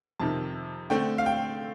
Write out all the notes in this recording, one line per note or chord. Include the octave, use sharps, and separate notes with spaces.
F2 C3 D#3 A5
D3 A3 C4 G5
F5
G5